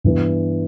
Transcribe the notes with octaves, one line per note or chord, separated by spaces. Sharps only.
G2 E3 B3